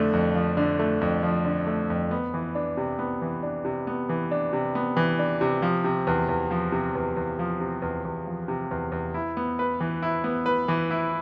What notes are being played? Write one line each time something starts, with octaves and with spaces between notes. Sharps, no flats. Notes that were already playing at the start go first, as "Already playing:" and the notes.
Already playing: F2 D3 A3
F2
F3
D3
A3
F2
F3
D3
A3
F2
B3
E3
D4
C3
B3
E3
D4
C3
B3
E3
D4
C3
B3
E3
D4
C3
F3
C3
E2
E2
F3
C3
E2
E2
F3
C3
E2
E2
F3
C3
E2
E2
E4
B3
B4
E3
E4
B3
B4
E3
E4